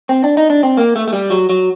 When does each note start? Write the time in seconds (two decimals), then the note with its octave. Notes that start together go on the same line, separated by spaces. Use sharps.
0.09 C4
0.24 D4
0.37 D#4
0.50 D4
0.63 C4
0.77 A#3
0.96 A3
1.08 A3
1.13 G3
1.30 F#3
1.49 F#3